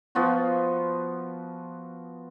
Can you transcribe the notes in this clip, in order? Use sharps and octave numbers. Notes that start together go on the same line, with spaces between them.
F3 B3 F4 F#4